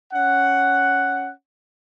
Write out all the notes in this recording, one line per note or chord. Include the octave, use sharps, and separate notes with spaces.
C#4 F#5